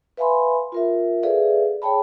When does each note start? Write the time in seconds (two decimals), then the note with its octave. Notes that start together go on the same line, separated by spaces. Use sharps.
0.17 B4 E5 F5 G#5 B5 C6
0.72 F4 A#4 E5
1.23 G#4 A4 B4 D5 E5 F5
1.82 G#4 C#5 G5 A5 B5